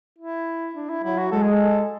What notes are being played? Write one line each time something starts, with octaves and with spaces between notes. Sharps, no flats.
E4
D4
E4
F#3 E4
F#4
G#3 A4
G#4
A4